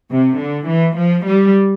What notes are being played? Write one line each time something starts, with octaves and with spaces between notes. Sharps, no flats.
C3
D3
E3
F3
G3